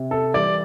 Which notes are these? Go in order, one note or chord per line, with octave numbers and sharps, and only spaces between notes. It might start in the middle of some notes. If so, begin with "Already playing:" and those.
Already playing: C3
A4
E3 G3 D5